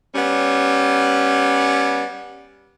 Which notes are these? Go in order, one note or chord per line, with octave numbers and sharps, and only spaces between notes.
G3 B3 C#4